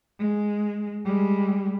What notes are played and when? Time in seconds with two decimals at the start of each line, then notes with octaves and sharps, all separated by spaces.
0.19 G#3
1.05 G3 G#3